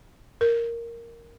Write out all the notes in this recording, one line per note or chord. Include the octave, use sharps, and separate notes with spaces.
A#4